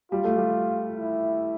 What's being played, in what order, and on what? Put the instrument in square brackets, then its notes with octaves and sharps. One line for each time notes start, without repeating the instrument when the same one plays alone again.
[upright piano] G3 [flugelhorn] F4
[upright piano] A3
G3
[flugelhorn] E4